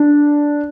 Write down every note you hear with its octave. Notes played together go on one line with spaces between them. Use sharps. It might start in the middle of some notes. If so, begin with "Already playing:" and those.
Already playing: D4